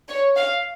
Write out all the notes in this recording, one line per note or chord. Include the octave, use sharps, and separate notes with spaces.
C#5
F5